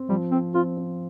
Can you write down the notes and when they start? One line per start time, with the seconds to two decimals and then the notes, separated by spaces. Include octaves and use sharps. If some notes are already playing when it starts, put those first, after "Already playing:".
Already playing: C4
0.09 F3 G3
0.31 C4 C5
0.54 C4 F4
0.77 C4